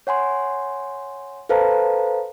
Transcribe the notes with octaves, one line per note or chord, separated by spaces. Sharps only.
C#5 F#5 G#5 C6
A4 B4 C5 F5 A5 A#5